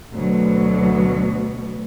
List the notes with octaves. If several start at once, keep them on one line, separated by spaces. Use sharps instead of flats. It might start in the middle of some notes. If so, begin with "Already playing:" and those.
D2 B2 F#3